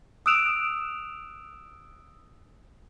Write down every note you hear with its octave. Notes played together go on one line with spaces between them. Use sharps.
D#6 E6 F#6 D7 E7 F7